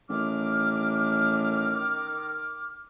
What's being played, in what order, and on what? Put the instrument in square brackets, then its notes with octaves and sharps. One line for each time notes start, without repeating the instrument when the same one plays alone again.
[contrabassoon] A1 [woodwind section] D#3 D6 F6